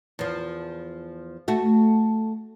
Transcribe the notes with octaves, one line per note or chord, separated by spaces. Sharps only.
E2 F3
A3 F#4